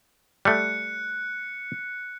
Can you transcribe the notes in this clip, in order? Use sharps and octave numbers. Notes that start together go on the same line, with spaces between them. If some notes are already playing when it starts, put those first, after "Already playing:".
G3 A3 F#6 C#7